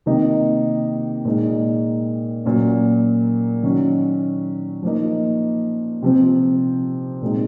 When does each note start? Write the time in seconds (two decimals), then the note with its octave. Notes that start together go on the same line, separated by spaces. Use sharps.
0.06 C3 D#3 A#3 D#4
1.25 A#2 G#3 D#4
2.44 A#2 F#3 C#4
3.63 D#3 F#3 C#4
4.82 F3 A#3 D#4
6.02 C3 F3 C4
7.22 A#2 G#3 C4 D#4